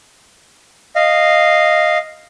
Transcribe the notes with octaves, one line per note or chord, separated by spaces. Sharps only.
D#5 F5